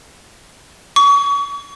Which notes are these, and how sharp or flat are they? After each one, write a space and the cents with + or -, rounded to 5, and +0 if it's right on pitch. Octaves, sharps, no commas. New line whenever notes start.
C#6 +35